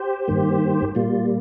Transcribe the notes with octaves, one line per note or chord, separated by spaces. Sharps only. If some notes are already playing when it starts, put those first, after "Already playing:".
Already playing: G4 C5
G2 D#3 A#3
A#2 G3 A#3 F4